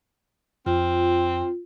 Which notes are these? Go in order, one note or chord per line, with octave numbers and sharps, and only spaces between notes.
F2 C4 F4